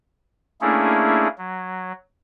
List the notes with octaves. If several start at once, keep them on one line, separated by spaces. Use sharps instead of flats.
A3 A#3 C#4 D4 E4 G#4
F#3